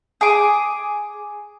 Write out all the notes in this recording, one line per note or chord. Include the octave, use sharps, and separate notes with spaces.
G#4 D6